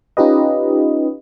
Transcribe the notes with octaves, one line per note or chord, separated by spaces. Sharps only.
C#4 D#4 F4 G4 B4 D#5